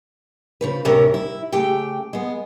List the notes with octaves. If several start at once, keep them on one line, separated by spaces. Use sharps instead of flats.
C#3 F3 B4
D2 A2 C3 E3 C#4 A#4
E4
C#3 A3 G4 G5
G#3 B3